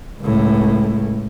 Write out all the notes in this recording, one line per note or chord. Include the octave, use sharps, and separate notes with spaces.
C#2 A2